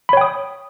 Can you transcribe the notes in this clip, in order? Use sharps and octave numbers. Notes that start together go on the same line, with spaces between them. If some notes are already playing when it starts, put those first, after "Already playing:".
C#5 G5 B5 D#6